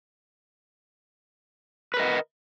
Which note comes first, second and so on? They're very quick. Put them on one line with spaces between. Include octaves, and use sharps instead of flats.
B4 A#4 D#5